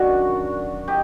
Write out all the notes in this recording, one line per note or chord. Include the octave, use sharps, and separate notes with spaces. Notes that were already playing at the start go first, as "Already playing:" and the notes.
Already playing: F#2 D#3 F#3 D4 F#4
D#4 G4